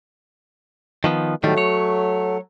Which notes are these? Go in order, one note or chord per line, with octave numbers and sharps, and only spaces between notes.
D#3 F3 B3
A2 D#3 F#3 G3 A3
C#5